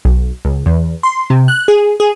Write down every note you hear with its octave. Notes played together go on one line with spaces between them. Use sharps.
B1
C#2
E2
C6
C3
F#6
G#4
G#4